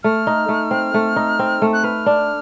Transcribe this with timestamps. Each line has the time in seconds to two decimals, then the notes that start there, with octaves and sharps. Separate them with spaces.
0.03 A3 F6
0.27 D#4
0.49 A3
0.71 C4
0.94 A3
1.16 D#4
1.39 C4
1.62 A3
1.73 F#6
1.84 B4 F6
2.06 D4